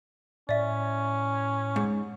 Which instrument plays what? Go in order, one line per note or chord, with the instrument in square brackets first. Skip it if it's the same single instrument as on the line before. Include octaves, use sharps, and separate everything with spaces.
[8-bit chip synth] A2 [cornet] C#4 [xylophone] D5 E5
[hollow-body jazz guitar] G#2